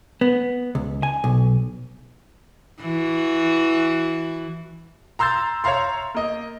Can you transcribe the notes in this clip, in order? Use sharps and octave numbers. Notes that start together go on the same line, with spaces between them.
B3
C#2
G#5
B1
E3 F#4
A#5 C6 E6 G6 A6
C#5 E5 F5 A#5 C6
A#3 D#5